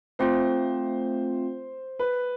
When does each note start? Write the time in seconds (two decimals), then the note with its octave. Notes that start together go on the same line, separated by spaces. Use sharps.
0.19 A3 C4 F4 C5
1.99 B4